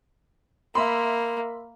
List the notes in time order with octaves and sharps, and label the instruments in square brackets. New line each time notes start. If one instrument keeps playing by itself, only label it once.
[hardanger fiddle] A#3 [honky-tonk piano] E5 B5 C6